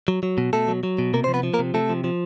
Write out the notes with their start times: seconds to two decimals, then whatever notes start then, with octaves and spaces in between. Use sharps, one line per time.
0.08 F#3
0.23 F#3
0.38 B2
0.53 B2 A3 A4
0.68 F#3
0.83 F#3
0.98 B2
1.13 C3 A#3 A#4
1.24 F3 C5
1.34 B3 B4
1.43 F3
1.54 A#3 A#4
1.59 C3
1.74 C3 A3 A4
1.89 F3
2.04 F3